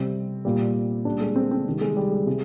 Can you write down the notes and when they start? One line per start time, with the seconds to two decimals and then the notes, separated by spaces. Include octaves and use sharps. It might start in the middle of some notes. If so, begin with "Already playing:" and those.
Already playing: C3 G3 C4
0.45 A#2 G3
1.05 A#2 G3 D4
1.21 G#3
1.36 C4
1.51 C4
1.66 C3 D#3 G3
1.81 G#3
1.96 G3
2.12 G#3
2.26 C3 G#3